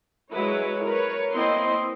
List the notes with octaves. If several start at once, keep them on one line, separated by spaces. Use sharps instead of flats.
F#3 G#3 E4 B4 C#5
A#4 B4 C#5
A#3 C4 E4 C5 D#5 C6